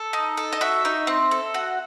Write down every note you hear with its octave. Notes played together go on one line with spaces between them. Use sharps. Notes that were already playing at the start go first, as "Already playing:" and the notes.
Already playing: A4
D#4
A4
D#5
F#4 E5
D#4
C4
A4
F#4